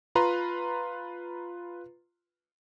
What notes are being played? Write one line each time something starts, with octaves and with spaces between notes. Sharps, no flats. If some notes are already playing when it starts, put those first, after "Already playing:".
F4 B4 A#5 C6